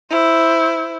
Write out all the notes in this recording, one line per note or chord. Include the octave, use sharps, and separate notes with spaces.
E4 C5